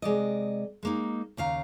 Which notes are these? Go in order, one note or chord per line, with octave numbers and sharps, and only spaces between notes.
C3 G#3 D5 D#5
G#3 A#3 D#4
D#2 C#3 F5 A#5